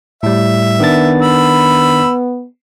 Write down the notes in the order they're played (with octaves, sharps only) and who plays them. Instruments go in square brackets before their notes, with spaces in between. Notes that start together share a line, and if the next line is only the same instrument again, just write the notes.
[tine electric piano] A2 G3 [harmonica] E5
[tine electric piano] D#3 D4 A6 [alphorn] B3
[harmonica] B5 E6